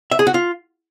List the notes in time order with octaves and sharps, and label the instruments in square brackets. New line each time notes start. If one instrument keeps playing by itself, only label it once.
[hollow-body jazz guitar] E5
G#4
F#4
F4